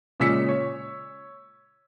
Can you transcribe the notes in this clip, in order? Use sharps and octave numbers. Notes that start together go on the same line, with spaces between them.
A#2 C#3 G#3 E6 B6 C#7
C#5